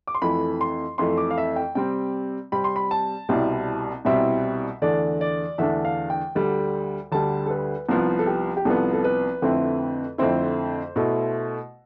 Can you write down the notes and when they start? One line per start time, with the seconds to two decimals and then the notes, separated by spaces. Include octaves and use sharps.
0.07 D6
0.15 C6
0.22 F2 E3 A3 B5
0.61 C6
0.98 F2 E3 A3 C6
1.18 D6
1.31 F5
1.38 E5
1.56 G5
1.75 C3 G3 C4 G5
2.52 C3 G3 C4 B5
2.64 C6
2.76 B5
2.91 A5
3.29 C2 B2 G3 C4 E4
4.05 C2 B2 G3 C4 E4 E5
4.82 E2 D3 A3 D4 D5
5.21 D5
5.58 E2 D3 A3 D4 E5
5.85 F5
6.10 G5
6.35 D2 D3 G3
7.12 D2 D3 G3 A5
7.46 A4
7.50 B4
7.89 C2 C3 F3 B3
8.19 A4
8.27 G4
8.57 G4
8.65 C2 C3 F3 B3 A4
8.93 A4
9.04 B4
9.42 F2 D3 A3 C4 E4
10.18 F2 D3 A3 C4 E4 C5
10.96 B2 A3 E4